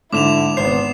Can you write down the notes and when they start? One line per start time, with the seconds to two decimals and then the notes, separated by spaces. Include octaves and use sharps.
0.13 G#2 D3 E4 D6 E7 F7
0.57 G#1 B3 C5 C7